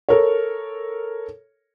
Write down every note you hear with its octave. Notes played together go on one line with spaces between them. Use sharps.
A4 A#4 C#5